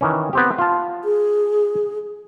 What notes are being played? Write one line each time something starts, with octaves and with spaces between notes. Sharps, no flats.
D#3 E3 C#4
B3 C4 G4
F4 A5
G#4